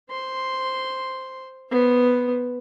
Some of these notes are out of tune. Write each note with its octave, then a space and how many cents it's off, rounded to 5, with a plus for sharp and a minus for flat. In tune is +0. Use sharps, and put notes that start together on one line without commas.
C5 +0 C6 +0
B3 +0 C5 +10